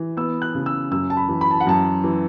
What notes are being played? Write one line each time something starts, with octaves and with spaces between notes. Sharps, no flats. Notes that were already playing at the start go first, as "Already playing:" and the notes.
Already playing: E3
B3 E6
F#6
C#3
E6
F#2 E6
A5
B5
E3
B5
A5
F#5
F#2 A5
E3